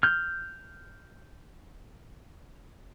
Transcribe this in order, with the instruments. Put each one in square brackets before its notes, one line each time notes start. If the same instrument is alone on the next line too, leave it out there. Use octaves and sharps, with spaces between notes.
[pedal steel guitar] F6 G6